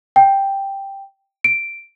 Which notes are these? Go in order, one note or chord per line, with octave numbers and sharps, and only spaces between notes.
G5
D7